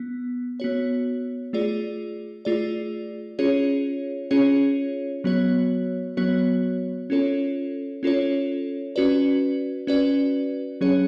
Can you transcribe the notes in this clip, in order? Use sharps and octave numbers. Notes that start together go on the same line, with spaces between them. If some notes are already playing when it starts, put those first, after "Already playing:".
Already playing: B3
B3 F#4 C#5
A3 F4 G#4 D5
A3 F4 G#4 D5
C#4 F4 G#4 C#5
C#4 F4 G#4 C#5
F#3 B3 F#4 C#5
F#3 B3 F#4 C#5
C#4 F4 A4 C#5
C#4 F4 A4 C#5
C#4 F#4 B4 D5
C#4 F#4 B4 D5
F#3 C#4 G#4 C#5